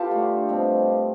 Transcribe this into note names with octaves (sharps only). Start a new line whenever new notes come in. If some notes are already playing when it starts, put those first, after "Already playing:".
Already playing: B3 F4 G4 A4 F5 G5 A5
D3 A3 D4
B2 G3 C4